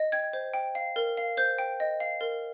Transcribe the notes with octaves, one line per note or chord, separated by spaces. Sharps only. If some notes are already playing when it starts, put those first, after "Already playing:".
Already playing: D#5
G5 G#6
C5
G5
F5
A#4
F5
C5 G6
G5
D#5
F5
A#4